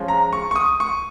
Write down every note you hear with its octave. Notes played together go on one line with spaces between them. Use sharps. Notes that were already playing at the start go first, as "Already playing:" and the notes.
Already playing: F3 G#3 C#4 F4
A#5
C#6
C#6
D#6
C#6